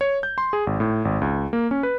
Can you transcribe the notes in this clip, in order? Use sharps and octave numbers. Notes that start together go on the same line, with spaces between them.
C#5
G6
C6
G#4
G#1
A2
G#1
C#2
A#3
C#4
B4